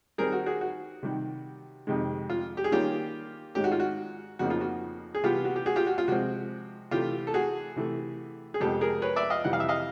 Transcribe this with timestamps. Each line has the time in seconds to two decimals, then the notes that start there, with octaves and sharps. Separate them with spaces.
0.18 D#3 G3 C4 D#4 G#4 A#4
0.32 F#4
0.46 F#4 G#4
0.61 F#4
1.03 C3 D#3 G3
1.87 F2 C3 D#3 G#3
2.30 F4
2.57 G4
2.64 G#4
2.72 D#3 G3 A#3 C#4 F4 G4
3.55 G#2 D#3 G#3 C#4 G4
3.64 F#4
3.72 F4
3.80 F#4
4.39 F2 C#3 F3 A#3 D#4 F#4
4.50 F4
4.61 F#4
5.15 G#4
5.23 C3 E3 G3 B3 F4 G4
5.45 F#4
5.56 G4
5.66 F#4 G#4
5.76 F4 G4
5.87 F#4
5.98 F4
6.08 C3 F3 G#3 C4 F#4
6.91 C3 E3 A3 F4 G4
7.27 A4
7.34 F#4 G#4
7.76 C3 E3 A3
8.54 G#4
8.60 F2 C3 F3 G#3 B3 G4 A4
8.81 G#4 A#4
9.02 B4 C#5
9.16 D5 E5
9.30 D#5 F5
9.44 F2 C3 E3 G3 F#5
9.53 F5
9.60 E5
9.69 D#5 F5